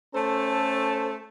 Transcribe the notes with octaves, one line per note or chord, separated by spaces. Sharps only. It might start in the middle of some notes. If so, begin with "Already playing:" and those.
A3 C#4 A4 C5 A5